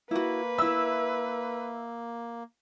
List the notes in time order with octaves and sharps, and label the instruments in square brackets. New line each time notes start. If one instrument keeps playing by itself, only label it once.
[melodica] A#3 [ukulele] E4 F#4 [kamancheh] B4
[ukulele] E4 E5 [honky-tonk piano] E6